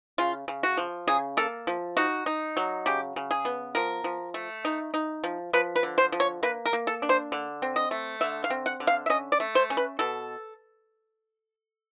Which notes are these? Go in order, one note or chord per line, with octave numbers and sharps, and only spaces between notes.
C#3 F4
C#3
F#4
F3
C#3 G#4
A#3 A4
F3
D#4 F#4
D#4
F#3
C#3 G4
C#3
G#4
B3
F3 A#4
F3
A3
D#4
D#4
F3
F3 B4
B4
D3
C5
F3
C#5
A#3 B4
A#4
A#3
A4
D4
C5
D3
C4
D#5
A3
D3 E5
F5
C4
F#5
D3
F5
E5
C#4 D#5
D5
A3
C5
C#4
B4
B2 A4